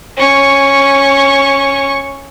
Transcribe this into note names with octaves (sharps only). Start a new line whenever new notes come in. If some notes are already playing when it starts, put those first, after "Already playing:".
C#4 C#6